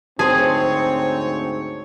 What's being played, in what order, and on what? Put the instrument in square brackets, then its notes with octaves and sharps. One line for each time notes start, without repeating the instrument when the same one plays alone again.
[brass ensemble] D2 G#2 C#5 [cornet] C4 [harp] G#4 [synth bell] C5 A5